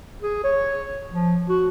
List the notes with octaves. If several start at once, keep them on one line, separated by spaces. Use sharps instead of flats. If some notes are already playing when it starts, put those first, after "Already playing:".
G#4
C#5
F3
F#4